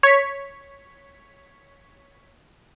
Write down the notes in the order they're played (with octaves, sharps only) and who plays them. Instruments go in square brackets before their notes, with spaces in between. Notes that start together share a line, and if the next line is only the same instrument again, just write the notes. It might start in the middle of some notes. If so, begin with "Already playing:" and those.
[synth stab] C#5 B6